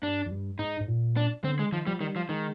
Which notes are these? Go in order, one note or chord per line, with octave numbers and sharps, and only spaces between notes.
G2 D4
F2
G2
G#2 D#4
G#2
A#2
D4
D3 C4
G#3
D#3 F3
F3 G3
D#3 G3
F3
D#3 G#3